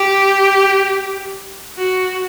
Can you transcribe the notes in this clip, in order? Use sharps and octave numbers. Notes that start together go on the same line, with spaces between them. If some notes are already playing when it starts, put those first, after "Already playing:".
Already playing: G4
F#4